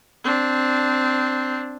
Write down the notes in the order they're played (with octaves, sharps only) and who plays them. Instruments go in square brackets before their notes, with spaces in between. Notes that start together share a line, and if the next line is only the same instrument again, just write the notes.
[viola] C4 D4